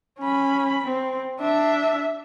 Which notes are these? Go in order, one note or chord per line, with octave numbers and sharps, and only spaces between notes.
C#4 B5
C4
D4 E5